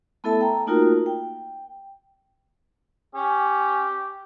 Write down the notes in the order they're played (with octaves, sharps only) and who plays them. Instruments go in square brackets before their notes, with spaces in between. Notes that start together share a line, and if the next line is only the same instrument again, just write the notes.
[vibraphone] A3 B3 E4 A4 E5 A5
G5 A#5
A3 A#3 D#4 F4 F#4 A#4
G5
[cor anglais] C#4 [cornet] G4